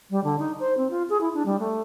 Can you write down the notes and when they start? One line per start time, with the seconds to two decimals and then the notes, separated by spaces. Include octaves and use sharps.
0.11 G3
0.24 D3
0.39 D#4
0.60 C5
0.77 C4
0.90 F4
1.10 G#4
1.21 E4
1.34 D4
1.46 G3
1.59 A3